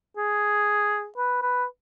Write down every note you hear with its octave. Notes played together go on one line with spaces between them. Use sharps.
G#4
B4
B4